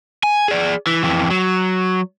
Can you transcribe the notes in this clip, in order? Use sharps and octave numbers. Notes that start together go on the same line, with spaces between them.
G#5
G#4 D5
E3
F2 E3
F#3